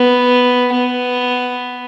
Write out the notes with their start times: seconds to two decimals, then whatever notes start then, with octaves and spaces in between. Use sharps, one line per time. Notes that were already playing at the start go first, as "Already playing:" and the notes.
Already playing: B3
0.73 B3